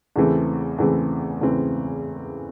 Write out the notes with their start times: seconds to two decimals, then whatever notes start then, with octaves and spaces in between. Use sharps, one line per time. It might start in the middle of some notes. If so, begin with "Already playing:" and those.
0.16 E2 C#3 E3 A3 C4
0.78 E2 C#3 E3 A3 C4
1.41 E2 C#3 E3 A3 C4